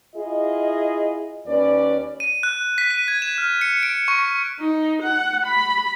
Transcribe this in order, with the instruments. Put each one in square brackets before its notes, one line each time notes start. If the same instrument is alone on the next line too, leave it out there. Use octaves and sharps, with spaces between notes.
[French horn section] E4 F4 G#4 D#5
D#2 C#4 B4 D5
[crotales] D#7
F#6
B6
D#7
G#6
E7
F6
C#7
D7
C#6
[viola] D#4
F#5
B5